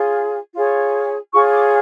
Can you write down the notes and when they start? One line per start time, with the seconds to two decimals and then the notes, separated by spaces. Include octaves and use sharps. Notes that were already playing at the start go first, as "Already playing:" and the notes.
Already playing: F4 G#4 C#5
0.53 F4 G#4 C#5
1.32 F4 G#4 C#5 C#6
1.52 D6